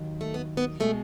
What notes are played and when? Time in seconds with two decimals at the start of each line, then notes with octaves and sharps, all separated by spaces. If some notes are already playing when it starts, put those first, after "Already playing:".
Already playing: D#2 D#3 F#3
0.21 A3
0.34 B3
0.57 B3
0.80 B2 G#3 A3